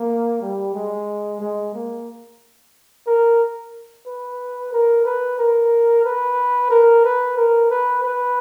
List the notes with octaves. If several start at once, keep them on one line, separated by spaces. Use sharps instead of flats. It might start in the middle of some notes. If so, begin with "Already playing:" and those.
Already playing: A#3
G3
G#3
G#3
A#3
A#4
B4
A#4
B4
A#4
B4
A#4
B4
A#4
B4
B4